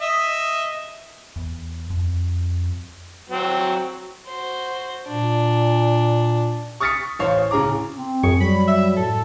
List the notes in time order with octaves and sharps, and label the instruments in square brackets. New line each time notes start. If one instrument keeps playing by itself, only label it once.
[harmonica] D#5 E5
[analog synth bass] E2
F2
[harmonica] F#3 C4
[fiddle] F#4 C5
[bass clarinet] A#2 [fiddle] D4
[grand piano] C#6 D#6 F6 A6 B6 C#7
A1 C5 C#5 F5
A2 C#3 G#4 A#5 D6
[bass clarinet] C4
[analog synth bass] F#2 [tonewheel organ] G#4 C#6
[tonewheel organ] F#3 [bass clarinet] G3 [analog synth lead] B5
[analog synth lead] E5
[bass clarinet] A2 [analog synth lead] A4